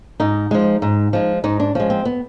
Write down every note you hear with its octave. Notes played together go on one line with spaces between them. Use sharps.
G#2 D#4
F3 G#3
G#2
F3 G#3
G#2 D#4
D4
F3 G#3 C#4
C4
B3